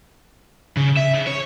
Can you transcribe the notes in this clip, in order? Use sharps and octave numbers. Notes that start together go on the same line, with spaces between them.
C#3
E5
C#3
C#5